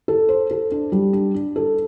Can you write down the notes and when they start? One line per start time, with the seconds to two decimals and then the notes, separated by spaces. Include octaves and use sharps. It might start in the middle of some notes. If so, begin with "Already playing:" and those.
0.08 A4
0.29 C5
0.51 A4
0.71 D4
0.92 G3
1.13 D4
1.34 D4
1.56 A4